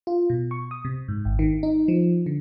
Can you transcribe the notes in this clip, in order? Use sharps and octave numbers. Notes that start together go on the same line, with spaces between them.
F4
B2
C#6
D#6
C3
G#2
G#1
D#3
D#4
F3
D3